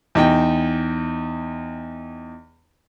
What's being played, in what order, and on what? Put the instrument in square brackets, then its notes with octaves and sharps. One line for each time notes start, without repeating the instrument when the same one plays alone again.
[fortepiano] E2 D#4 G5